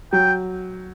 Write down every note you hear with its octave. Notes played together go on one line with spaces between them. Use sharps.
F#3 G5